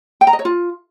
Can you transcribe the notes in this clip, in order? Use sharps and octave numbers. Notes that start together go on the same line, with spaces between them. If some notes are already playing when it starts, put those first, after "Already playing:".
G5
A#5
D#5
C#5
F4